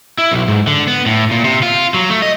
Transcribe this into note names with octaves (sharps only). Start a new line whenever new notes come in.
E4
B1
G#2
D3
B3
A2
A#2
C3
F4
F#3
A3
D#5